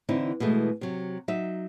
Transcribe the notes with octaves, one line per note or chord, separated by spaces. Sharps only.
D3 E3 C4 D#4 E4
B2 E3 G#3 A3
C3 F#3
F#3 D#4 E5